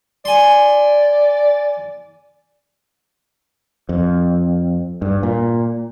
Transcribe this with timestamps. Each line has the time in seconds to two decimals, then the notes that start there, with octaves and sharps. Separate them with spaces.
0.25 D5 G#5 C6
3.89 F2
5.02 G2
5.23 A#2